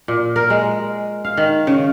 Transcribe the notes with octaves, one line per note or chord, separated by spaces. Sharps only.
A#2
A#4
G#3
F5
D#3
C#3